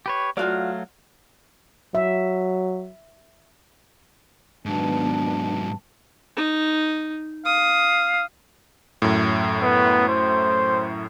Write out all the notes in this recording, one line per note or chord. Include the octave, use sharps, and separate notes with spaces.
G4 B4 C#5
F#3 A3 F4 F#4 D5 F5
F#3 E5
G#2 D#3 F#3 B3 D4 A5
D#4
F5 D#6
F#2 A2
B3
C5